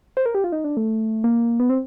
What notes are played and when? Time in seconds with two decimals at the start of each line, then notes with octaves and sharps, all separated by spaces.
0.17 C5
0.26 A#4
0.35 G4
0.44 F4
0.52 D#4
0.64 D4
0.77 A3
1.24 A#3
1.60 B3
1.70 C4